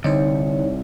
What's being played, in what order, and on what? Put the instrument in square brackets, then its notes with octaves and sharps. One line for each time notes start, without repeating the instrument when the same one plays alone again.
[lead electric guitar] C2 [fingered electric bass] D3 [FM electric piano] D#4 C5 [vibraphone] C#5